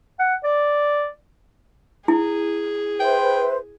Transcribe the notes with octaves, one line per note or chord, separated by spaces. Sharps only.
F#5
D5
E4 G#4
B4 C5 E5 G5